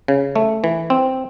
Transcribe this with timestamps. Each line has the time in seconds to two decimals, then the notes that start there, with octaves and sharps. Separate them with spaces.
0.08 C#3
0.36 A3
0.64 E3
0.90 C4